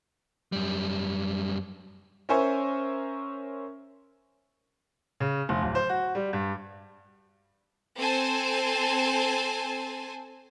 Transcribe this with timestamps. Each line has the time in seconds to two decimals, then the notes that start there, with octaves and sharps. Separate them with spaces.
0.52 F#2 G3
2.29 C#4 A#4 C5 E5 G#5 C#6
5.20 C#3
5.49 F1
5.61 D1
5.75 C5
5.89 F#4
6.15 G3
6.33 G2
7.99 C4 A4 C5 G#5 A5